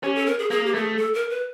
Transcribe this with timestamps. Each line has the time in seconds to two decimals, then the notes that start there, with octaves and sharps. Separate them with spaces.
0.03 C#4 G4
0.15 A4
0.26 A#4
0.39 G#4
0.51 A#3 G#4
0.66 G4
0.74 A3 G#4
0.98 A4
1.15 A#4
1.30 B4